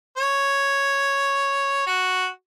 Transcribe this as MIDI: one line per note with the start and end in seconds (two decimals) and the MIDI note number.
0.17 1.85 73
1.87 2.26 66